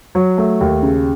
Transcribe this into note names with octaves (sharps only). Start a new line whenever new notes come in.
F#3
A3
D#2
C#3